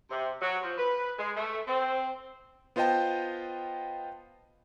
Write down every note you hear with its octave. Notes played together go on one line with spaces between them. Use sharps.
C3
F#3
F3
B4
G#3
A3
C4
B3 F4 C5 D#5 G5 A5